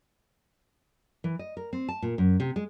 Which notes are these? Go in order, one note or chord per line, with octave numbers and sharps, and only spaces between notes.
E3
D#5
A#4
C4
A5
A#2
F#2
C3
G#3